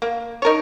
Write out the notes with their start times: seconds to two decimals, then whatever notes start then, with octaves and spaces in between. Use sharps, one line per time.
0.02 A#3
0.42 D#4 A#4 C#5